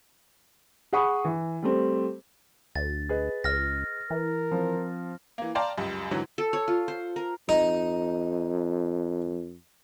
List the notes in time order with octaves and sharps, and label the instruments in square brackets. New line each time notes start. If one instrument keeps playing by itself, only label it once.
[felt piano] G#4 F#5 B5 C#6 D#6
E3
G3 A3 C4
[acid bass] D2 [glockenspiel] A6
[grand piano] G#4 B4 D#5
[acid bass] C#2 [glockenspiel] F6 A#6
[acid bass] E3 [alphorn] A#4
[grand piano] F3 C4
[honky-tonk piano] E3 A#3
D5 F5 G5 A5 A#5 C6
C#2 F#2 G3
G#2 D3 E3 F#3
[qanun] A4
C#5
F4
C5
A#4
[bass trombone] F2 [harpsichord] D#4